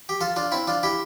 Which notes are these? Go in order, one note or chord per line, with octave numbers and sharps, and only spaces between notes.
G4
F4 A4
D4 F4
C4 E4
D4 F4
E4 G4